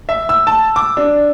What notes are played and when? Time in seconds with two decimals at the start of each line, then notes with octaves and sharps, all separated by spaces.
0.09 E5
0.29 E6
0.47 A5
0.76 D6
0.97 D4